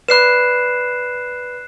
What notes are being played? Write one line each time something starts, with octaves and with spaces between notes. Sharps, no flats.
B4 D5 B5 F#6 C7 E7